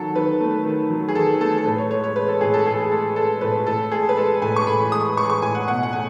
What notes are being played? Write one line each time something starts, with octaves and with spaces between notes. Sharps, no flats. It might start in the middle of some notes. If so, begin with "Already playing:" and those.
Already playing: D#3 F#3 A4
D#3 B4
A3
D#3
F#3
G#4
D#3 A4
A3 A4
A4
A2 B4
C#5
G#3 C#5
C#5
G#3 B4
A4
A2 G#4
A4
A2 G#4
A4
G#4
G#3 A4
G#3 A4
A2 B4
A2 A4
G#3 G#4
B4
G#3 A4
A2 G#5
C#6
A2 B5
G#3 D#6
G#3 C#6
C#6
A2 G#5
F#5
B2 F#5
F#5
A3 G#5